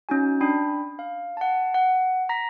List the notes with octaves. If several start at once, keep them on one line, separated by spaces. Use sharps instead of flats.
C#4 D#4 F#4 G#5
D4 G5 B5
F5
F#5 A5
F#5
A#5 A#6 B6